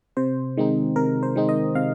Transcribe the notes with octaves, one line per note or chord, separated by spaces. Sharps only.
C3 C5
D#3 G#3 C4 D#4
C3 A#4
C5
D#3 G#3 C4 D#4
D#5
C3 F5